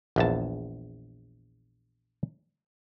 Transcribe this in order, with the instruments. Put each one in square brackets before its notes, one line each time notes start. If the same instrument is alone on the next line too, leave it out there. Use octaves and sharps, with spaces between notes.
[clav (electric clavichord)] A#1 E2 A5